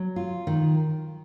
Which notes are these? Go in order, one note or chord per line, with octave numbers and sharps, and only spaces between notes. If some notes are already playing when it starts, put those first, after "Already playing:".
Already playing: F#3
F4
D#3